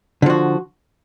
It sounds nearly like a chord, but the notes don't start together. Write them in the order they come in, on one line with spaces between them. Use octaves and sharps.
D3 F3 F#4